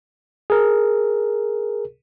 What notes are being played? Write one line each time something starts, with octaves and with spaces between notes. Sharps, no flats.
G#4 A#4